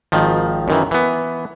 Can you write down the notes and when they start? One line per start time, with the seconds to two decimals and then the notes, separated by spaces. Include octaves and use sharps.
0.12 G#1 D#3 F3
0.68 F#2 D#3 E3
0.91 E3 B3